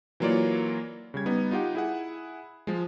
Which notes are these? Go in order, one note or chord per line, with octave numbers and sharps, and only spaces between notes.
E3 F#3 A#3 F4 C#5 D5
C#3 G3 G#6
G3 B3 D#4
D#4 F4 G4 F#5
E4 G#4 F#5
F3 G#3